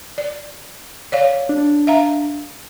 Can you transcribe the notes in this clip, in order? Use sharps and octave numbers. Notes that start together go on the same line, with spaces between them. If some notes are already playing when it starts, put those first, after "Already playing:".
D5
C#5 D5 F5
D4
E5 F5 A#5